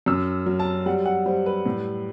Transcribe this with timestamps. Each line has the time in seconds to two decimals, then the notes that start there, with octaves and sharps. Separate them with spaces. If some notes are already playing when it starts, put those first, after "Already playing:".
0.06 F#2 E6
0.46 F#3
0.59 A5
0.86 G3 F#5
1.05 F#5
1.26 G3 C5
1.46 B4
1.66 A2